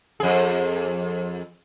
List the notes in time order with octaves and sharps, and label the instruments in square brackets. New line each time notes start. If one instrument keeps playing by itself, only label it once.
[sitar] F2 G#4